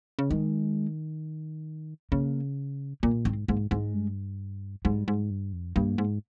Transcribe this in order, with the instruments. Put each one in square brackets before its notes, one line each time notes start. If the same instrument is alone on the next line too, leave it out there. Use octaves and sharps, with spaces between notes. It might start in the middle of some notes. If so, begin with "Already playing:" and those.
[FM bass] C#3
[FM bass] D#3 [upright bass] G#3
[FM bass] C#3 [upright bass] A#3
[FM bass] A#2 [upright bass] A#3
[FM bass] G#2 [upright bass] C4
[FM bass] G#2 [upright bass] A#3
[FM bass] G#2 [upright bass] G#3
[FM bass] G2
[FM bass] G#2 [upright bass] G3
[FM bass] G#2
G2
F2
[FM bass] G2 [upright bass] A#3
[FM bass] G#2